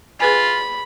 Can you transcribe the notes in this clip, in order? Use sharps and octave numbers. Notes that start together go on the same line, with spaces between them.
F4 G#4 B4 G#5 B5